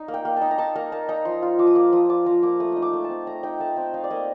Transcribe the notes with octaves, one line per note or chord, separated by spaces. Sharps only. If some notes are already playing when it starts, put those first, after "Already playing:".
Already playing: D#4
A#3
G5
A#3
D#4 A5
A#5
D#4 A5
A#3 A#5
A#3 A5
D#4 A#5
F3 C6
F4
F3 D6
D#6
A#3 D6
F3 D#6
F4 D6
F3 A#5
A#3 D6
A3 D#6
D#4 D#6
D6
A3
A5
C4
A3 A#5
D#4 G5
A3 A5
C4 G5
D#4 F5
D5
A#3 D#5